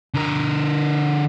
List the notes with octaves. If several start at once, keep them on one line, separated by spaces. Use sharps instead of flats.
D3 A#4